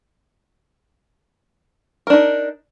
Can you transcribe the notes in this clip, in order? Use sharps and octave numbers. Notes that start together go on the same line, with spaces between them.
D4 D#4 A#4